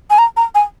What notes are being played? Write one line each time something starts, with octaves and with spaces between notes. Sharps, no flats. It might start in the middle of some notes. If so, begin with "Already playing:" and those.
G#5
A#5
A#5
G#5